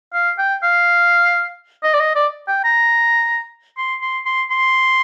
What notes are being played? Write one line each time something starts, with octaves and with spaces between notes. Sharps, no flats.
F5
G5
F5
D#5
D5
D#5
D5
G5
A#5
C6
C6
C6
C6